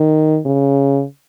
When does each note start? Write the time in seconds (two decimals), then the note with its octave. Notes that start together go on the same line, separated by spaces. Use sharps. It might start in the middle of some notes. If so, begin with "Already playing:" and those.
Already playing: D#3
0.46 C#3